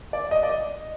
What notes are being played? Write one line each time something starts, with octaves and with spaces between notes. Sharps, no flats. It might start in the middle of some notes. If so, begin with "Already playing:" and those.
D5
D#5
D5
D#5